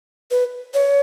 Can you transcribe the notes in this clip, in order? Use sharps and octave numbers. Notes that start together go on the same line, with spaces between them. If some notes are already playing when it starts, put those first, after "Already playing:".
B4
C#5